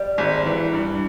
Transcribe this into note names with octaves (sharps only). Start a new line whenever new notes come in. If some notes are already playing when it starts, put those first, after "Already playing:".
Already playing: G3
G#1
E3
G2